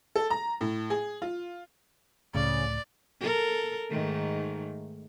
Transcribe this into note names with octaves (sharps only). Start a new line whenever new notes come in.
A4
A#5
A2
G#4
F4
C#2 A2 C#3 D5
A4 A#4
G#2 D#3 A3